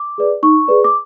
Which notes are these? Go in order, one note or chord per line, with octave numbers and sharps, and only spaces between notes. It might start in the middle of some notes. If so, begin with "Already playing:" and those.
Already playing: D6
G#4 B4 D5
D#4 C#6
G#4 B4 D5
D6